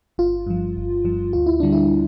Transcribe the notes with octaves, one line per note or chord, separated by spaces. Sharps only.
G1 F4
G2 F3
G1
G2 F3
D2 F4
E4
D3 G3 D4
E4